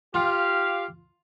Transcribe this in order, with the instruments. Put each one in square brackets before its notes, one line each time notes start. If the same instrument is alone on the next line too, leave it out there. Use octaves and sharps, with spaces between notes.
[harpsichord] F4 [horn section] G4 F5